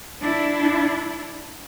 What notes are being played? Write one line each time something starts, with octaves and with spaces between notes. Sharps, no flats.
D4 E4